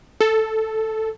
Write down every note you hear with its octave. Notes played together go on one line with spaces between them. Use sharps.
A4